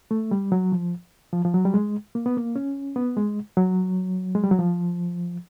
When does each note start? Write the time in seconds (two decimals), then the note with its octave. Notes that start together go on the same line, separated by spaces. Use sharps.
0.11 A3
0.31 G3
0.52 F#3
0.72 F3
1.33 F3
1.45 F3
1.54 F#3
1.65 G3
1.74 G#3
2.15 A#3
2.26 B3
2.37 A#3
2.56 C#4
2.96 B3
3.17 G#3
3.57 F#3
4.35 G#3
4.44 G3
4.51 F#3
4.59 F3